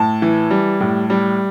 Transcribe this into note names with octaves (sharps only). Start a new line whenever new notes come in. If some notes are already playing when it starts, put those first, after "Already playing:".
Already playing: A2 A5
E3
G3
A2
G3